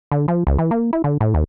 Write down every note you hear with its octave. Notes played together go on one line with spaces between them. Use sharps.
D3
F3
C#2
E3
A#3
E4
D3
A2
D#2